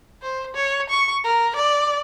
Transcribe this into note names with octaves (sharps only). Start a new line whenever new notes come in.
C5
C#5
C#6
A#4
D5